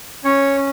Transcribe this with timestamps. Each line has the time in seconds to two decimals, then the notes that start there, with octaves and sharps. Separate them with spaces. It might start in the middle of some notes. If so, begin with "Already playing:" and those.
0.24 C#4 C#5